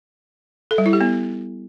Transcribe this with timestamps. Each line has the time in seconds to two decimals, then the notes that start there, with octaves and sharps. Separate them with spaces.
0.71 A4
0.78 G3
0.86 E4
0.93 G4
1.01 B3